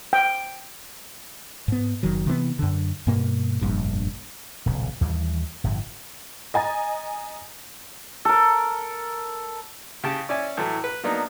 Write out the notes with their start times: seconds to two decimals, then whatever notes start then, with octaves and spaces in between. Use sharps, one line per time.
0.13 G5
1.68 G#2 B3
2.03 F#1 D#3 F#3
2.26 C3 E3 A#3 B3
2.59 F#2 D3
3.07 G2 B2 A#3
3.61 F1 A#1 G2
4.66 D#1 B1 A#2 C#3
5.01 D#2 E3 F3 G3
5.64 G1 A2 F3
6.54 D#5 G#5 A#5 A6
8.25 A4 A#4
10.04 C#3 G4 G5 A5
10.29 C#4 D5 E5 G#5
10.57 A2 E3 F#3 A3
10.84 B4
11.03 F#3 A#3 B3 D4 D#4